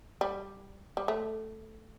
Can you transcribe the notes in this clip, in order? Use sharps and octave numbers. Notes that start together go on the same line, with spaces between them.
G3
G3
A3